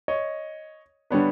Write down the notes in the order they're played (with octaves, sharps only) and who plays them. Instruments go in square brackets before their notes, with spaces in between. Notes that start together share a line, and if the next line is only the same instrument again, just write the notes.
[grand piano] C#5 D#5
D3 G3 B3 D4 B4 C#5